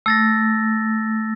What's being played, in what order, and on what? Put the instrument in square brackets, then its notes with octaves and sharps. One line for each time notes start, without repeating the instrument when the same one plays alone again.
[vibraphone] A3 [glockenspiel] E6 A6 A#6